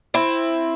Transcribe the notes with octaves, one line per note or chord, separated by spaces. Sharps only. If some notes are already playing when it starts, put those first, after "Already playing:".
C4 E4